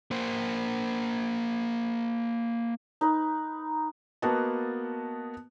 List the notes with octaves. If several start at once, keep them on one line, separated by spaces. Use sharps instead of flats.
A#3 C5
D#4 B4
A#3 B3 F#4 D#5 A5